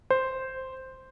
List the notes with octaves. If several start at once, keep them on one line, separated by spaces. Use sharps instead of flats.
C5